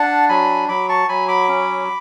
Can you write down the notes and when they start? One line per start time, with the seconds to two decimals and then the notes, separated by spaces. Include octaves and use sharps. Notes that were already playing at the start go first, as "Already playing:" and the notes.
Already playing: D4 F#5 A5
0.29 F#3 G#5 B5
0.68 F#3 B5 D6
0.88 A5 C#6
1.08 F#3 G#5 B5
1.28 B5 D6
1.48 C#4